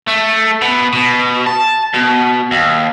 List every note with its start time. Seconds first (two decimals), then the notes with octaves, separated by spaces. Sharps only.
0.08 A3
0.62 B2
0.93 B2
1.46 A5
1.94 B2
2.51 D#2